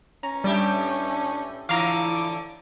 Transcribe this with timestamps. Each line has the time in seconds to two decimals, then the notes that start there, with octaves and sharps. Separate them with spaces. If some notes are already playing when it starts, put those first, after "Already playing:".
0.23 C#4 A#5
0.44 A2 G3 D4 G4 E5
1.69 A2 D3 E3 E4 F5 A#5 D6